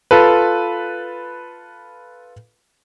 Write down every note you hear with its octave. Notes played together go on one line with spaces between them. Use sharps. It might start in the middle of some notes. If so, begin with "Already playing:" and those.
F4 A4 B4